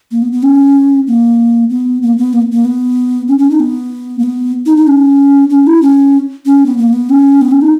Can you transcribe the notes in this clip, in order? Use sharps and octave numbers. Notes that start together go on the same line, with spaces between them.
A#3
B3
B3
C#4
A#3
B3
A#3
B3
A#3
A#3
B3
C#4
C#4
D#4
B3
A#3
B3
D#4
D#4
C#4
C#4
E4
C#4
C#4
B3
A#3
B3
C#4
B3
C#4
D#4